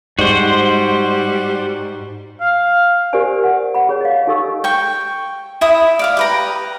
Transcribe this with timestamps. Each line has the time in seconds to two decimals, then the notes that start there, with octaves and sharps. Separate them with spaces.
0.19 G#2 G3 F#4 C5
2.41 F5
3.13 G4 A#4 C5 D5 G#5
3.44 F#5
3.74 F#5 B5
3.89 G#4 C#5 G5
4.01 D#5 F5
4.27 D#4 G4 A4 D#5 C#6 E6
4.64 G5 C#6
5.61 E4 E5 D#6
5.99 D5 F5 D6
6.17 G4 B4 A#5